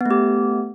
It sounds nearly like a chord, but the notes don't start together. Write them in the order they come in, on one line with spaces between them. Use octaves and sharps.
B3 A3 G4